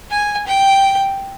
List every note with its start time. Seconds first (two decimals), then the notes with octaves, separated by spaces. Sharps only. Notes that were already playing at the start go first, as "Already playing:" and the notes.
0.11 G#5
0.47 G5